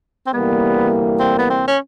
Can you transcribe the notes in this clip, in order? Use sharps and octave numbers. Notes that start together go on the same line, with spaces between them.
C4
D2 C3 E3 G3 A#3 B3
C4
B3
C4
C#4